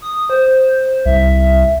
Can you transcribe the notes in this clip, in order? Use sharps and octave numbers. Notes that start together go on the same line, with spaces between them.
D#6
C5
C2 E5